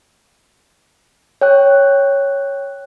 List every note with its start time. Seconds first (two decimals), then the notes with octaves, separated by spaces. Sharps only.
1.41 C#5 G5 F#6